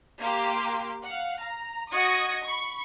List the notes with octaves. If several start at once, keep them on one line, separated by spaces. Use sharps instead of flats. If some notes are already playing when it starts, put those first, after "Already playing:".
A#3 G4 C6 D6
F5 F#5
A#5
F#4 D#5 D#6 G#6 A#6 C#7
B5 C#6